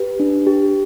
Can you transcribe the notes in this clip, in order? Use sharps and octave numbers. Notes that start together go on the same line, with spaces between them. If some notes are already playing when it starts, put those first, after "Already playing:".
Already playing: G4 B4
D4
G4